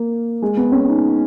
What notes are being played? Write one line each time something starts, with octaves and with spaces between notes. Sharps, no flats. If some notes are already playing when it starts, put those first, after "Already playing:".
Already playing: A#3
G#3
B3
C#4
D#4